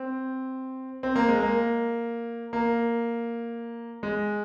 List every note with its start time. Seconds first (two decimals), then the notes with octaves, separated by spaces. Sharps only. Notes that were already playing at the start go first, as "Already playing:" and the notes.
Already playing: C4
1.03 C4
1.16 A#3
1.28 G#3
1.40 A#3
2.53 A#3
4.03 G#3